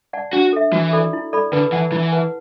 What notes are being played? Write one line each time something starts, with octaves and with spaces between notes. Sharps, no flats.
D5 F#5 A5
D4 F#4
A4 E5
E3 F#4
A4 D5 B5
E4
A4 D5 B5
D3 B4
E3 F#5 A5
E3 E4
B4 F#5 A5